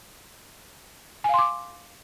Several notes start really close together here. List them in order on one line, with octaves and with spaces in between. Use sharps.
G#5 F5 C6 D6